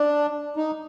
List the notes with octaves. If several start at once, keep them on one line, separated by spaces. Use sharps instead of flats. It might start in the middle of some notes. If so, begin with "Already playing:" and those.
Already playing: D4
D#4